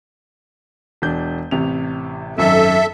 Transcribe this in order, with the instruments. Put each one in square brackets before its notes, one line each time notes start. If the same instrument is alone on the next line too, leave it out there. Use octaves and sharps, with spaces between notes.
[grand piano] E1 D4 G6
A1 C3 F7
[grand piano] G#1 F#2 [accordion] A4 E5